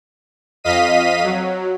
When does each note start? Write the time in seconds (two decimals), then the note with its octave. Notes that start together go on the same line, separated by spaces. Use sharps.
0.64 F2 D#5 F5 B6 D#7
1.24 F#3